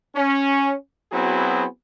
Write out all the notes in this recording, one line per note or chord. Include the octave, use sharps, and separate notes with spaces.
C#4
F#3 B3 C4 E4 F#4 G#4